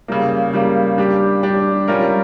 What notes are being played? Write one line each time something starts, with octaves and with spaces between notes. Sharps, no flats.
C#3 G3 A#3
C#3 G3 A#3
G3 D4 G4
G3 D4 G4
G3 C#4 F4 A#4